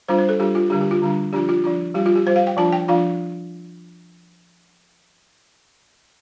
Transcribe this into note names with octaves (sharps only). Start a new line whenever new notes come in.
G3 D4 F4 C5
C5
A4
G3 D4 F4 G4
F4
D3 G3 D4 G4
G4
F4
D3 G3 D4
F3 D4 F4 G4
F4
F3 D4 F4
G3 F4 G4
F4
G4
G3 F4 C5
F5
G5
F3 D4 F4 A5
G5
F3 D4 F4 F5